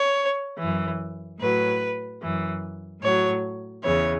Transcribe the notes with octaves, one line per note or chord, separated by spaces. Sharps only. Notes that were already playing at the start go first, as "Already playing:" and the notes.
Already playing: C#5
F#2 E3
A2 F#3 B4
F#2 E3
A2 F#3 C#5
E2 C#3 E3 C#5